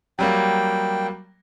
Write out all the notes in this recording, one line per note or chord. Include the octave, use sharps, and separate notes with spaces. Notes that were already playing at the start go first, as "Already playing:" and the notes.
F#3 G3 A#3 G5